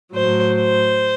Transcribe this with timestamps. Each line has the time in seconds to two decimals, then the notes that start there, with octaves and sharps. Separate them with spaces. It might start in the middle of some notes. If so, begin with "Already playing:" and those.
0.14 A2 F#3 C5
0.55 C5